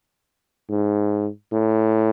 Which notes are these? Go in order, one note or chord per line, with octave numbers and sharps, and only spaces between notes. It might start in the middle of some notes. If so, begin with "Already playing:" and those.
G#2
A2